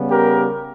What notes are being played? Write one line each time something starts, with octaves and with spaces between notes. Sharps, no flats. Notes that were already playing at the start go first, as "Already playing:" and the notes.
Already playing: C#3 G3 B3
G4 A#4